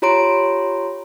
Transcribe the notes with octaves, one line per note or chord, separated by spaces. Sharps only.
F4 G4 C#5 A#5 C6 D7